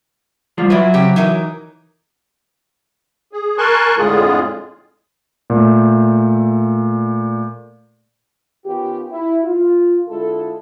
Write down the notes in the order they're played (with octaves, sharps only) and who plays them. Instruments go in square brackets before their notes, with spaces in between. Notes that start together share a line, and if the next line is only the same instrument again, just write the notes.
[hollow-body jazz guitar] F3 G3 F4
[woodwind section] F#3 [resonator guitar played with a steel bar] E4 F4 [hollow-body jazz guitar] B4 E5
[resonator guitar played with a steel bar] C#3 C4 G4
E3 D#4 A#4
[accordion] G#4
A#4 G#5 A5 C6 C#6 F#6
F2 A2 D3 G#3 F4 G#4
[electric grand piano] A#2 A3
[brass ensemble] D#3 B3 C#4 F4 G4
E4
F4
D3 G#3 E4 F4 A4